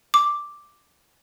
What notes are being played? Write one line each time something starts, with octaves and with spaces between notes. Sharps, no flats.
D6